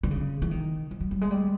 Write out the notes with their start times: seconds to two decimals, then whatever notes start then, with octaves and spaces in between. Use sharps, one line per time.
0.03 D3
0.11 C#3
0.42 E3
0.51 D#3
0.91 E3
1.01 F#3
1.11 G3
1.21 G#3
1.31 G3